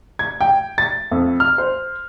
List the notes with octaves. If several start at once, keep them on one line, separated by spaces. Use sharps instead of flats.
G#6
G5
A6
F2
F6
C5